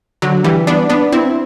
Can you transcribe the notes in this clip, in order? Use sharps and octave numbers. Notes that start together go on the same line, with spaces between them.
D3 F#3
E3 G3
B3 D4
B3 D4
C4 E4